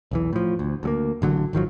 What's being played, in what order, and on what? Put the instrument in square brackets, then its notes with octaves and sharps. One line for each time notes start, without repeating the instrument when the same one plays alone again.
[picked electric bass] B1 E2 E3
A2 F3
D2
D2 F#3 A#3
A1 D3 F#3
G#1 D#3 F3 F#3